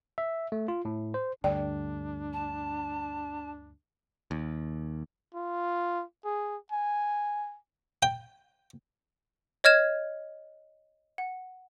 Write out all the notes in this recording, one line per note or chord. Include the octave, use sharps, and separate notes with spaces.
E5
A3
F4
A2
C5
D2 G2 D3 D4 D5 G5
A5
D#2
F4
G#4
G#5
G5
C#5 D#5 F6 G#6 E7
F#5